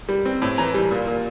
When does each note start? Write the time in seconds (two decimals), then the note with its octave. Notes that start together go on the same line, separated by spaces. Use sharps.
0.09 G3
0.25 C4
0.42 A2
0.58 E3 G#5 A#5
0.75 G3
0.91 A#2
1.07 A#2